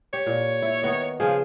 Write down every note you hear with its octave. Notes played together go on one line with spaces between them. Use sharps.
G4 C#5
A#2
E4
D#3 B3 D#5
C#3 F3 G#4